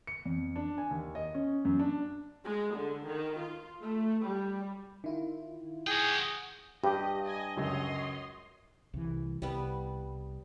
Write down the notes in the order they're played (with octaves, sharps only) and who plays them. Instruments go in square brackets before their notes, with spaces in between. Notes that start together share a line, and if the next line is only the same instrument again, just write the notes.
[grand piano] C#7
F2
D4
G#5
D#2
D#5
C#4
F#2
D4
[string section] G#3
D3
D#3
F4
A3
G3
[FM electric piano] D#3 E4 F4
[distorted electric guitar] F#4 G5 [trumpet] G#4
[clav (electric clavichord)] G2 [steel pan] G4 [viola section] D#5
[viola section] D#5 G#5
[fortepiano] C#2 F#2 [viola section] C#5 D#5 C6
[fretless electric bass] C2 E3
[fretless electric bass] C2 [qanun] G3 B3